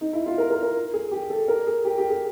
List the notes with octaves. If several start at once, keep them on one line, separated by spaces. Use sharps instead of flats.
D#4
E4
F4
A#4
A#4
A#4
G#4
G4
A4
A#4
G#4
G4
G4
G#4